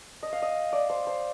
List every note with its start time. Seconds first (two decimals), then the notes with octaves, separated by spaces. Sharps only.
0.23 D#5
0.33 F5
0.42 D#5
0.73 D5
0.90 C5
1.07 C5